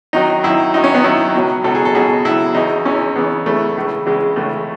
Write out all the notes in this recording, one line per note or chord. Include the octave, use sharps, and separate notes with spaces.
F#2 D#3 F#3 D#4
F#2 D#3 F#3 E4
F#2 D#3 F#3 D#4
C#4
B3
F#2 D#3 F#3 E4
C#2 B2 F#3
C#2 B2 F#3 A4
G#4
A4
C#2 B2 F#3 G#4
C#2 B2 F#3 E4
E2 C#3 E3 D#4
E2 C#3 E3 C#4
E2 C#3 E3 B3
E2 C#3 E3 A3
C#2 C#3 E3
C#2 C#3 E3 G#3
C#2 C#3 E3 A3